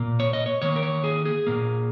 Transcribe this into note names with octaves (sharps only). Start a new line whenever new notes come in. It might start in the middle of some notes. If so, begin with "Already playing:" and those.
Already playing: A#2 A#3
C#5
D#5
C#5
D#3 A#3 C#5
A#4
C#5
G#4
G#4
A#2 A#3